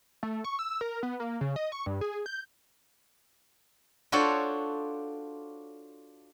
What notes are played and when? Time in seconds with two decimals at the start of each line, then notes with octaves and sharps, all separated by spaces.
0.23 A3
0.44 C#6
0.59 E6
0.81 A#4
1.03 B3
1.20 A#3
1.41 C#3
1.56 D#5
1.72 C#6
1.86 G2
2.01 G#4
2.26 G6
4.12 D4 F4 F#4 A4 C5 C#5